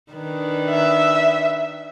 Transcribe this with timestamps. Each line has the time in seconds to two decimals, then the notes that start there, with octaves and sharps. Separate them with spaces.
0.12 D#3 D4 B4
0.70 E5